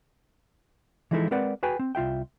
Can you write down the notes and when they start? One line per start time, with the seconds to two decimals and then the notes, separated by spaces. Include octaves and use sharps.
1.11 E3 F3 G#3 D#4 E4 A4
1.31 G#3 C4 A#4 B4 D5 F#5
1.63 F#4 G#4 B4 G5 G#5
1.79 C4
1.95 C2 F4 E5 G5